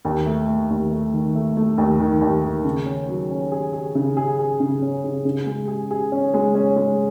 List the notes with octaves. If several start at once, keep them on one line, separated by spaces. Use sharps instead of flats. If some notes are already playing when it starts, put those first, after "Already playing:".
D#2
A3
A3
D#2
A3
D#3
A3
A3
D#2
D#3
D#2
D#3
C#3
C#4
F#3
C#4
G#4
G#4
C#3
G#4
G#4
C#3
C#4
C#3
C#3
G#3
G#4
G#4
C#4
G#3
C#4
G#3